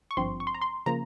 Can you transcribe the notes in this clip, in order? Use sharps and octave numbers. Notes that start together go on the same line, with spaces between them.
C#6
G#1 G2 F3 C4 C6
C#6
C6
A#5
C6
C#3 F3 A#3 A#5